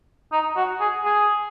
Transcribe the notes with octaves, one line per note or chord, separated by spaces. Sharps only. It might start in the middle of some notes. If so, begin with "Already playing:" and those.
D#4
F#4
G#4
G#4